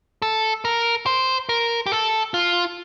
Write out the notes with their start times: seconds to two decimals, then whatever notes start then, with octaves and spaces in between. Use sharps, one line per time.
0.22 A4
0.65 A#4
1.06 C5
1.49 A#4
1.86 G4
1.92 A4
2.34 F4